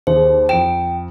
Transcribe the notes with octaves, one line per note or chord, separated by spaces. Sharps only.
D#2 G#4 C5
F2 G5 D7 E7